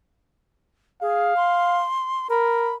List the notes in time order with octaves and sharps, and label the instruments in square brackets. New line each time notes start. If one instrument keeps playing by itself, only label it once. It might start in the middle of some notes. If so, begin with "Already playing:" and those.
[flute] G#4 [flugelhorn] F5
[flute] C6
[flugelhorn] A#4 [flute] B5